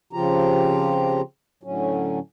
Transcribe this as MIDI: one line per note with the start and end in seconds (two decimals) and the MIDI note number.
0.13 1.21 49
0.13 1.21 53
0.13 1.21 60
0.13 1.21 65
0.13 1.21 67
0.13 1.21 82
1.63 2.19 45
1.63 2.19 50
1.63 2.19 54
1.63 2.19 61